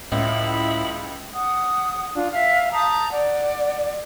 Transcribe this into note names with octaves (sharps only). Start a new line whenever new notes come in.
C#2 A2 E4 F4 D#5 E5
F#5 D#6
D4 F4
E5 F5
A5 A#5 D#6 G6
D5 F#5